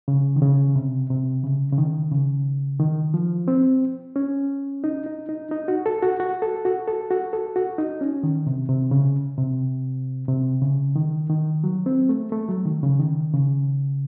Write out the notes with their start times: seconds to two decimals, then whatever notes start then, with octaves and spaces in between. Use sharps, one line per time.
0.08 C#3
0.36 D#3
0.41 C#3
0.76 C3
1.10 C3
1.44 C#3
1.72 C#3
1.78 D#3
2.12 C#3
2.80 D#3
3.14 F3
3.48 C4
4.16 C#4
4.84 D#4
5.06 D#4
5.29 D#4
5.51 D#4
5.68 F#4
5.86 A4
6.02 F#4
6.20 F#4
6.42 A4
6.65 F#4
6.88 A4
7.11 F#4
7.33 A4
7.56 F#4
7.78 D#4
8.01 C#4
8.23 D#3
8.47 C3
8.69 C3
8.91 C#3
9.37 C3
10.28 C3
10.62 C#3
10.96 D#3
11.30 D#3
11.64 F#3
11.86 C4
12.09 A3
12.32 A3
12.49 F#3
12.66 D#3
12.83 C#3
13.00 D#3
13.34 C#3